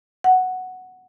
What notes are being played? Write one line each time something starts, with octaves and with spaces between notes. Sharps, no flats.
F#5